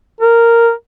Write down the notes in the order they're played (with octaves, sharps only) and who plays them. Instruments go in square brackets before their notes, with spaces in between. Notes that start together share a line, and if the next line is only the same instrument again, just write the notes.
[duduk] A#4